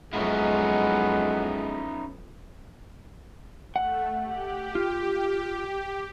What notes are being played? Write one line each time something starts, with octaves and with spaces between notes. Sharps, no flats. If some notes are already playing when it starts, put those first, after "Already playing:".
F2 F#3 G#3 B3 C#4 D#4 E4 F#5
A3 F#5
G4
F4